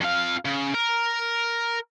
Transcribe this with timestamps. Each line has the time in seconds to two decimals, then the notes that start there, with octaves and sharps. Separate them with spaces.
0.01 F2 F5
0.45 C#3
0.75 A#4